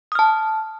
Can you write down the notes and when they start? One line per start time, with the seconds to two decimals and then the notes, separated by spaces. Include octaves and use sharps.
0.12 D#6
0.15 F6
0.19 A5